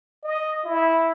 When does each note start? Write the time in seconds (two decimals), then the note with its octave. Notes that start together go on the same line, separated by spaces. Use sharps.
0.24 D#5
0.64 E4